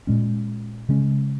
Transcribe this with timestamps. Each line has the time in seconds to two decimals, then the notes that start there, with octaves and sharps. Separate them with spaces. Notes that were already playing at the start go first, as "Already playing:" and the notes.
0.07 A#2 G#3 C#4
0.89 C#3 G#3 C#4